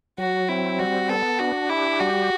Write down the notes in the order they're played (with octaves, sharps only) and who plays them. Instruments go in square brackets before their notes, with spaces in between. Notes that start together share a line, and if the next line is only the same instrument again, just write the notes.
[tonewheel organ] F#3 [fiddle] F#4
[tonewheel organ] C4 [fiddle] E4
[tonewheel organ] G3 [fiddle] F#4
[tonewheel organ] B3 [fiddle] A4
[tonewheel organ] D4 [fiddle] F#4
[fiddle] E4 [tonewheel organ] G4
[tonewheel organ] G3 [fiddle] F#4